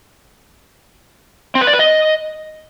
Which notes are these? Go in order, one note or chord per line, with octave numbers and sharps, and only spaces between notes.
C4
B4
D5
B4
D#5